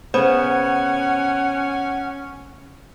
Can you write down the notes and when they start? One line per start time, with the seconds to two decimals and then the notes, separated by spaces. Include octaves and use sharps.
0.14 C#3 B3 C#4 C5 F#5